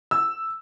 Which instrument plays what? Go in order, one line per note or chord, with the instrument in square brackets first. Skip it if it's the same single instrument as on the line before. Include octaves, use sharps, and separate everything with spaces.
[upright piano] E6